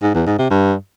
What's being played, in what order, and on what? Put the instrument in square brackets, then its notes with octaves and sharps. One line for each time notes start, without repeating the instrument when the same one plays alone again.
[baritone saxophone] G#2
E2
G#2
C3
G2